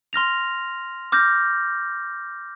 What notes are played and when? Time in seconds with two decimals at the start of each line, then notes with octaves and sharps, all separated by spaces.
0.13 C6 F6 A#6 F7
1.12 D6 F6 G6 A#6